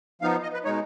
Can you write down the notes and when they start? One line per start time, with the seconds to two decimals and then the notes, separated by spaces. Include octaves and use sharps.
0.22 F3 B3 D#4 F5
0.43 D#5
0.53 B4
0.64 B2 G#3 D#4 C#5